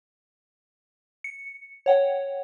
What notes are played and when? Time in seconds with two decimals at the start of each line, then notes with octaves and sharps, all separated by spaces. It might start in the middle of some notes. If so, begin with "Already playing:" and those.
1.24 C#7
1.86 C#5 F#5 G5